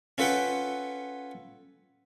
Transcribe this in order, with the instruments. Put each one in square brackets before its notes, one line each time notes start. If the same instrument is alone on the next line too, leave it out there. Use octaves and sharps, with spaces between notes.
[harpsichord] C#4 F4 A4 B4 F#5 G5